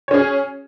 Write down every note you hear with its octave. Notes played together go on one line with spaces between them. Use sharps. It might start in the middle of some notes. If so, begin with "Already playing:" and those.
C#4 G#4 C#5